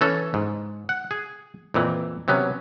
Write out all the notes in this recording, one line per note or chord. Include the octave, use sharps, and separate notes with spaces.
E3 C#4 A4
G#2
F#5
G#4
F2 A#2 E3
C3 F#3 B3 C#4